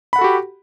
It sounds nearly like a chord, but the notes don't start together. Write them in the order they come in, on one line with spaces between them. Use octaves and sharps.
B5 F#5 A4 F#4 G4